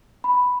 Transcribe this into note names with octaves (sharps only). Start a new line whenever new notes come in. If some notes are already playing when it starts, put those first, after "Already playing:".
B5